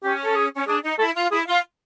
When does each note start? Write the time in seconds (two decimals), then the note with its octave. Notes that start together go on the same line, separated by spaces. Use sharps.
0.03 C#4 G4
0.25 A4
0.36 G#4
0.54 C#4
0.67 D4 G#4
0.83 D#4
0.98 E4 A4
1.15 F4
1.31 E4 G#4
1.46 F4